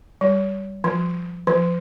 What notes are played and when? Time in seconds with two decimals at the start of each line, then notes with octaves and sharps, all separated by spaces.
0.21 G3
0.84 F3
1.47 F3